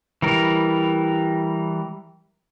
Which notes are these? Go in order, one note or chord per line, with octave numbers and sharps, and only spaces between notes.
E3 G3 A#4